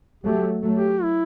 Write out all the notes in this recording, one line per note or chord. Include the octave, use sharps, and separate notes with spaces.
F#3 A3 G4
F#3 A3
G4
E4